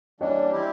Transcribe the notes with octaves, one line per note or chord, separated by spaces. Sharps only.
E3 G3 A#3 D4 C#5 D#5
G3 C4 E4 G4